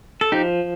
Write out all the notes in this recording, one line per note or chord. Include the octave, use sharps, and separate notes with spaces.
A4
F3 D#4 G4